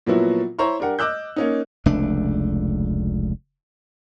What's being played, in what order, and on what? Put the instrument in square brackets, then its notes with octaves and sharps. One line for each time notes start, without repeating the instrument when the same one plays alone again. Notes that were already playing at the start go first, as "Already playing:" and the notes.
[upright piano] A#2 F3 F#3 B3 E4 F#4
E4 C5 C#5 A#5 C6 C#6
D4 G4 A#4 F#5
D#5 D6 E6 F#6 G6
A#3 C#4 D#4
[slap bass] F1 C#2 A3 D4